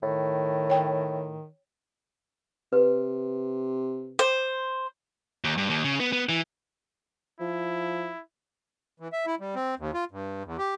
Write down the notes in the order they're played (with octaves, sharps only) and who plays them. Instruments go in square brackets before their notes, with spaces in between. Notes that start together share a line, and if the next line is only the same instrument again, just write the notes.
[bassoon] A2 [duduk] D#3
[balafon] C#5 G5
[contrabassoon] C3 [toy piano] B4
[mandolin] C5
[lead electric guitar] D#2
G2
D#2
C#3
B3
B3
E3
[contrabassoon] F3 [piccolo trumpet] E4
[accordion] E3
E5
E4
G3
C4
D#2
F4
G2
E2
G4